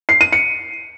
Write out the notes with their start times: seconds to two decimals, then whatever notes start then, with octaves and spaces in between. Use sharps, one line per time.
0.09 C7
0.21 D#7
0.32 C#7